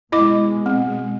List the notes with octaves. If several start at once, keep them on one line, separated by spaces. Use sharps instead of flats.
B2 G#3 E4 D#5 D6
C4